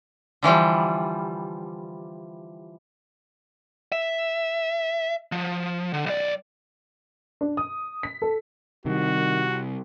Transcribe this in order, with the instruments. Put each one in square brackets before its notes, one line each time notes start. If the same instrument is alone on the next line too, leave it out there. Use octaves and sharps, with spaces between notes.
[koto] D3 E3 F3 G3
[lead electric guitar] E5
F3
D3
B1 D5
[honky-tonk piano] D4
D#6
B6
A4
[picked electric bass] C3 G3 [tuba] D#3 [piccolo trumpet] F#4